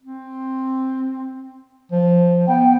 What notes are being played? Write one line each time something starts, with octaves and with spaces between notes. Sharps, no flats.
C4
F3
B3 G5